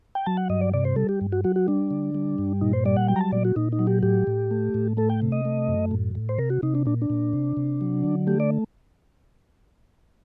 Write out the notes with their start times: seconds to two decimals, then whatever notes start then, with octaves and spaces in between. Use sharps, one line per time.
0.15 G5
0.26 F#3 A5
0.37 F#5
0.49 G2 D#5
0.61 D5
0.73 C3 D5
0.85 C5
0.96 G3 A4
1.09 G4
1.21 G2
1.32 F#4
1.44 F#3 F#4
1.56 F#4
1.68 G3 D4
1.91 D3
2.15 G3
2.38 G2
2.61 A#2 D#4
2.73 C5
2.85 G3 D5
2.97 F#5
3.08 F#3 G5
3.16 A#5
3.20 A5
3.32 A#2 D5
3.45 F#4
3.56 A#2 D#4
3.72 D#4
3.79 F#3
3.87 G4
4.03 A2 G4
4.27 A2
4.51 A3
4.74 A2
4.97 A3 A4
5.10 G5
5.22 C3
5.32 D#5
5.45 A3
5.68 F#2
5.91 A2
6.15 A2
6.29 C5
6.38 C3 A#4
6.50 F#4
6.62 C3 D#4
6.75 D4
6.85 A#2 D4
7.02 D4
7.10 A#2
7.33 C3
7.57 C3
7.81 F#3
8.03 D3
8.27 A3 G4
8.40 D5